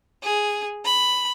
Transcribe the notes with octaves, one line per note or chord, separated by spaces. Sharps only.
G#4
B5